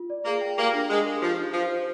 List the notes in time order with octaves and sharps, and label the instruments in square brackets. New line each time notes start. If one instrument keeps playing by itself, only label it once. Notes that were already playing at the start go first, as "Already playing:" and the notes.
Already playing: [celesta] F4
D5
[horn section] A#3 [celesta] G#4
[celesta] G5
[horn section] A#3 [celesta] G4
[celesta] D4
[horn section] G#3 [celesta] D4
[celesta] A#4
[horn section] F3 [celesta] G4
[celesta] D#4
[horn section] F3 [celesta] C5
[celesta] C5